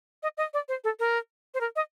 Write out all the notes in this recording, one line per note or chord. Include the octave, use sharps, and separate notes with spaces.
D#5
D#5
D5
C5
A4
A#4
C5
A#4
D#5